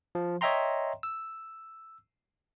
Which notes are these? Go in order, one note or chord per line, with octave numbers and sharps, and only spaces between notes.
F3
C#5 D#5 E5 G5 A#5 C6
E6